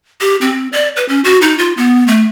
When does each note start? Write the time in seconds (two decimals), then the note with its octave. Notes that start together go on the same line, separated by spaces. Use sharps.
0.21 G4
0.41 C4
0.73 D5
0.96 B4
1.09 C#4
1.24 F#4
1.42 D#4
1.58 F4
1.77 B3
2.07 A3